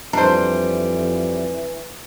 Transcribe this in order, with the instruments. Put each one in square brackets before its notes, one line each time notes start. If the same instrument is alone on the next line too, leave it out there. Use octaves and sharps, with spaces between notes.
[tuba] F2 [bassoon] E3 [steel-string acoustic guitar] G3 [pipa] D4 C5